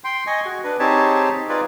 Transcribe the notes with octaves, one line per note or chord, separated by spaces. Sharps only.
G5 C6
D#5 G#5 C#6
F#4 G#4
D4 B4
C4 D#4 G4 G#4 C#5 A5
D#4 F4 G#4 B4 D5